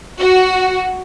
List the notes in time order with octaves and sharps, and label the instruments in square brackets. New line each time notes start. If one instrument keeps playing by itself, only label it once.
[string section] F#4